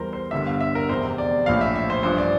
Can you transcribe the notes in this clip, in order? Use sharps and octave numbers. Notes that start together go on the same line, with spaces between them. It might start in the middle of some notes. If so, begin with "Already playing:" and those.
Already playing: E2 E3 G3 A#4 C5
C5
G1 G2 D3 G3 E5
F5
E5
A#4
F1 E2 C3 C5
D5
A#1 A2 F3 F5
E5
E5
C5
A1 G2 F3 C5
D5